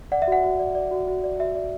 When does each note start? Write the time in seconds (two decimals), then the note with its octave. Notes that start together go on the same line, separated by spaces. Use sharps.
0.12 D5 F#5
0.22 E5
0.28 F#4 F#5
0.44 F#4
0.59 D5
0.75 D5
0.91 F#4
1.07 F#4
1.24 D5
1.39 F#4 E5
1.55 D5